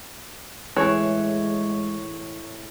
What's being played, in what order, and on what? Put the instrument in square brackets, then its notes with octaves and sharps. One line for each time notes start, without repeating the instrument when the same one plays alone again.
[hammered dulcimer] A2 [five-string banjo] E3 G#4 [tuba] G#3 [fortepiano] C#5